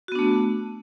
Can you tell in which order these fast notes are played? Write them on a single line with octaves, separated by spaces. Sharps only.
F#4 B3 D4 A3